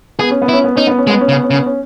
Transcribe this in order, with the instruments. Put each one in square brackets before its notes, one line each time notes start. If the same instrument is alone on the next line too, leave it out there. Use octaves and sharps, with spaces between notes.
[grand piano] B3 [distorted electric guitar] G#4
[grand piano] C#4
B3
[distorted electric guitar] E4
[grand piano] C#4
B3
[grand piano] C#4 [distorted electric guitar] D#4
[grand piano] B3
C#4
[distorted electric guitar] G#3
[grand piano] B3
C#4
[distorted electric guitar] C#3
[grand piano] B3
C#4
[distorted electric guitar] C#3
[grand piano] B3
C#4